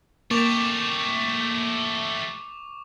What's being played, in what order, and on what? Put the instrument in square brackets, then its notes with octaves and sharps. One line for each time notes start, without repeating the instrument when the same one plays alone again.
[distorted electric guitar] A3 G4 [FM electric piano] A#3 [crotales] C#6 D6 F7